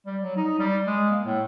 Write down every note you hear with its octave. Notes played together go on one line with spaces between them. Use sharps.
G3
F#3
D#4
G3
G#3
A#3
A2